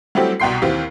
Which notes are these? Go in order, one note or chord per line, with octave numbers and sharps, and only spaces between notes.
F#3 G3 A3 C4 E4 G4
C2 B2 F#5 G5 C6 C7
D#2 E3 C4 G4 F5 C7